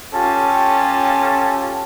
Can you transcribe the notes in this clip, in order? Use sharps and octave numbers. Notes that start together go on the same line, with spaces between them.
C#4 F4 G4 A4 A5